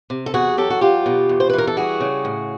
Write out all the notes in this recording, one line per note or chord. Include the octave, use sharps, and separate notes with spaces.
C3
A4
E2 F#4 G#4
F#3 G4 A4
F#4
E2 F4 G4
B2
E2
C5
B4
E3 A#4
A4
G3 F#4 G#4
C#3
A2